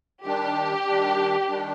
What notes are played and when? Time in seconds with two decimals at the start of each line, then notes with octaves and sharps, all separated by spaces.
0.24 D#3 G3 D4 G4
0.87 D#3 G3 D4
1.48 D#3 G3 D4